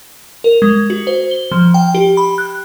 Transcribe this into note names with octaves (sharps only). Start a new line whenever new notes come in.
A#4
G#3
F#4
C5
G7
F3
G5
G4
B5
F#6